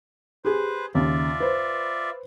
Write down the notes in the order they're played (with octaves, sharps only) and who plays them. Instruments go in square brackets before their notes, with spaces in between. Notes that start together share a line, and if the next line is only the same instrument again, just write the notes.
[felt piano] G4 G#4 [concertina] B4 C5
[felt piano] D#2 C#3 [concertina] F4 D5 E5
[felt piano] B4 C5